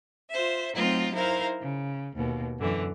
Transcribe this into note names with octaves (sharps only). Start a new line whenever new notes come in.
F4 C5 E5
F#3 A3 C4 D#4 F4 D#5
D#4 E4 A#4 C5 F5
C#3
D#2 B2
F#2 D3 E3